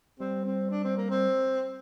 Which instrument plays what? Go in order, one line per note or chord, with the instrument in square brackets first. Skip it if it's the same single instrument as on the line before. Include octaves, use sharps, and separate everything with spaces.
[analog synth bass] G3 [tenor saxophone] C4
[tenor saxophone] C4
D4
C4
A#3
C4